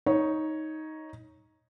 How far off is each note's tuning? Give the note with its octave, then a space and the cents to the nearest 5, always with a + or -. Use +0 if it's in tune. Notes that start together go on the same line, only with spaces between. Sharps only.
D#4 +10 C#5 +0